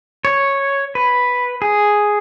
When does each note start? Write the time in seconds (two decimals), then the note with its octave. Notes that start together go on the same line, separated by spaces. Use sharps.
0.25 C#5
0.95 B4
1.62 G#4